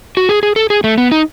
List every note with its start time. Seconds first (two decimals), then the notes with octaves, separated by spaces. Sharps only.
0.17 F#4
0.29 G#4
0.43 G#4
0.56 A4
0.70 G#4
0.84 A3
0.98 B3
1.12 D#4